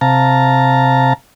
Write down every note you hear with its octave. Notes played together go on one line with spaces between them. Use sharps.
C3 F5 A5 A#5